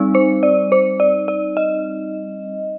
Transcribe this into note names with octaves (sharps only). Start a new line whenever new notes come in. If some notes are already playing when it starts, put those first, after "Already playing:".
Already playing: G3 C4 D#4
C5
D5
C5
D5
D5
D#5